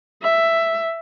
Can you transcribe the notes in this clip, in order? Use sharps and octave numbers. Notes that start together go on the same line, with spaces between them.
E5